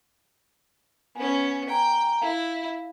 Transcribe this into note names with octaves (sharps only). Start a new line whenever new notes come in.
B3 C#4 G#5
G5 G#5 A#5
E4 F5